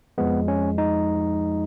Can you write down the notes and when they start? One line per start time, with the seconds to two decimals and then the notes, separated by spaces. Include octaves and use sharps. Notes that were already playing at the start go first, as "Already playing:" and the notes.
0.18 F2 F3 G#3 B3
0.48 C#4
0.78 D#4